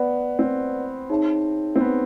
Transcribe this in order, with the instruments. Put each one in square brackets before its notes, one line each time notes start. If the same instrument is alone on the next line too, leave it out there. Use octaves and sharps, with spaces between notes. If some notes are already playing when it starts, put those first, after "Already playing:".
Already playing: [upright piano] B3 [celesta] B4 D5 F#5
[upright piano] C4
[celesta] D#4 G#4 C#5 E5 A5
[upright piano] C4
B3